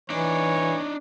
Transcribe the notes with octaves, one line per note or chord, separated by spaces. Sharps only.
E3 D4 D#4 C#5